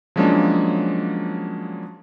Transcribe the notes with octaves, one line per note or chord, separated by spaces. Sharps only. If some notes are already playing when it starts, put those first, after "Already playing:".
F3 F#3 G#3 A#3 C#4 D4